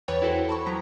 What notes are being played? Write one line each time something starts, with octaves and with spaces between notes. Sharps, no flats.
E2 E3 B4 C#5 G5 A6
E4 F#4 A4 C5
A5 B5 C#6
F3 F#3 A#5 B6